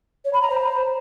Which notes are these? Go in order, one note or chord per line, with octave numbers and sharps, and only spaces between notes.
C#5
B5
A#5
C5